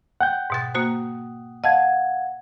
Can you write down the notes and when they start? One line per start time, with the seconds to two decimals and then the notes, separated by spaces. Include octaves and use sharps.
0.21 F#5 G5 G6
0.50 G#2 B2 A6
0.75 A#3 F#4 C5 D#6
1.64 D#5 F5 F#5 A5 G#6